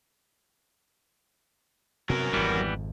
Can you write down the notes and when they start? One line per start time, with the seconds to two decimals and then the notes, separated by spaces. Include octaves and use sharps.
2.09 C3 F#3 B3 F#4 A#4
2.33 G#1 F2 E3 G3 B3